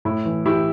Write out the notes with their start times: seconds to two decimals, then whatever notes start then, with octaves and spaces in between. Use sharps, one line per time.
0.05 A2 E4
0.25 E3
0.46 E3 E4 G4